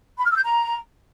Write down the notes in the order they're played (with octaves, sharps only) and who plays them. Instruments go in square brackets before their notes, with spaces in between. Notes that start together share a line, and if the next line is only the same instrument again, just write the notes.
[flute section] B5
F6
E6
G6
A#5